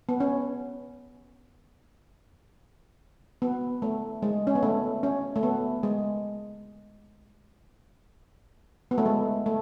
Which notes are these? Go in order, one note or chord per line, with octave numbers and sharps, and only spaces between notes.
B3
C#4
B3
A3
G#3
C#4
B3
A3
C#4
A3
B3
G#3
B3
A3
G#3
A3